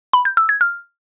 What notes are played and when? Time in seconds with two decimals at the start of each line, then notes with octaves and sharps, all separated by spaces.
0.13 B5
0.25 G6
0.37 E6
0.49 G#6
0.61 F6